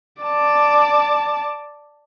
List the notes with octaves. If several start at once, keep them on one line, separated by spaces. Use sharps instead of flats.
D5 A5